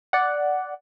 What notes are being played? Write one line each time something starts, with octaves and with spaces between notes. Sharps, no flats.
D5 F#5